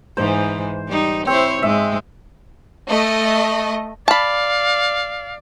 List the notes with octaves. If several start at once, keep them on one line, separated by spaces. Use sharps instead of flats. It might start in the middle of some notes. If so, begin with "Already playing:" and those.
G#2 E3 C5
G3 D#4
C4 E4 C5 C#5
G#2 G#3 E5
A3 D#5
D5 F5 A5 B5